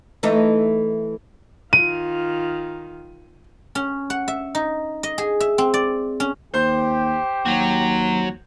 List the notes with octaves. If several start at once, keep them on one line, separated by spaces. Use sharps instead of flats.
E3 A3 D#4
D#3 F4 D#7
C#4
F#5
E5
D#4
D#5
G#4
E5
C4
D5
C#4
D#2 G4 C5 G6
D#2 F#3 F#4